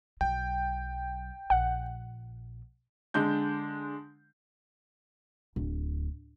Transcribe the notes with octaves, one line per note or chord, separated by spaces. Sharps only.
B1 F#3 G5
A#1 F#5
D3 G#3 D4 G6
D1